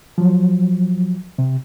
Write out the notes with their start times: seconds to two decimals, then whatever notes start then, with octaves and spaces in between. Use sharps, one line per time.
0.18 F3 F#3
1.39 C3